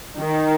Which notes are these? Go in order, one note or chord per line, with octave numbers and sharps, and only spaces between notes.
D#3